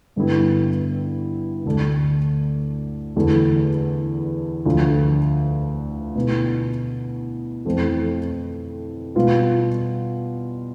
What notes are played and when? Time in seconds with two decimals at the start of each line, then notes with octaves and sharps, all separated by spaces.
0.16 G2 D3 G3 B3 E4
1.65 D2 D3 A3 D4
3.16 E2 D3 A3 E4
4.66 D2 D3 F3
6.15 B2 B3 E4
7.65 F2 E3 A3 C4 E4
9.15 B2 G3 B3 F4